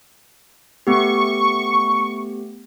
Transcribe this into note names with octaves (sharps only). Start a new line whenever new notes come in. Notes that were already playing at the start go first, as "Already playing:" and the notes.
A3 B3 G4 C#6